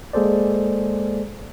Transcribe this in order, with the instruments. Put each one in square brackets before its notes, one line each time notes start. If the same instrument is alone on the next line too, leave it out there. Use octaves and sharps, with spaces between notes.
[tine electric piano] G#3 A#3 G#4 A4 C5 D5